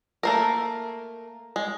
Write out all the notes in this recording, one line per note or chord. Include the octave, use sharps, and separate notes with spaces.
A3 A#3 A#4
G#3